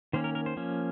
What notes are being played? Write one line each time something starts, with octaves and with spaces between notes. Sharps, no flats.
D#3 A#3 C#4 C5
A#4
A#4
C5
F3 A#3 C#4